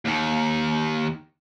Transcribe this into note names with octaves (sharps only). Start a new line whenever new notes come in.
D#2 D#3